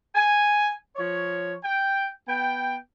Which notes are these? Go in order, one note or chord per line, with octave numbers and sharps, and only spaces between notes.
G#5
F3 C#5
G5
B3 G5